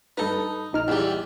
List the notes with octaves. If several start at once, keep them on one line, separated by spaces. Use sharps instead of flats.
G2 D#4 A4 B4
A#1 D#4 F6
E2 G3